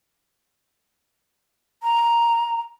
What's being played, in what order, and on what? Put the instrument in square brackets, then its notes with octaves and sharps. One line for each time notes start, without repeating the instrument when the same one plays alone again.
[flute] A#5